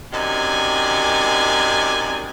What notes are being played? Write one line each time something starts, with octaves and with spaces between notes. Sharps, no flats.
F#2 C3 D#4 D5 G#5